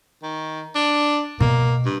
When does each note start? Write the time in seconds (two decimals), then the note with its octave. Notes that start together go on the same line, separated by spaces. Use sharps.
0.22 D#3
0.75 D4
1.40 B2 A#3
1.85 G2